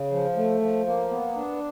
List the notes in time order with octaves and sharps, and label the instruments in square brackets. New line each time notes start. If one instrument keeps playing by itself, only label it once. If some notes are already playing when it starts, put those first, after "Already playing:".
Already playing: [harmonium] C#3
F3
A3
F3
A#3
B3
D4